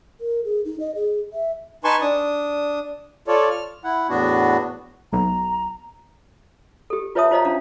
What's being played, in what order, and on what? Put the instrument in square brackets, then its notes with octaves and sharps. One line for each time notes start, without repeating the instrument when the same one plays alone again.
[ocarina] A#4
G#4
D#4
D#5
G#4
E5
[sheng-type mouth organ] D#4 B4 G#5 A5 C6 C#6
D4 D#6
F4 A4 C#5 D5
F6
[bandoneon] E4 F#5
E2 A2 B3 D4 F#4
[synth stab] B1 [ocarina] A#5
[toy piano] G4 A4
F4 B4 C#5 E5 A5 D#6
F4 C5 C#5 D#5 F5 A#5
C#4 D4 F5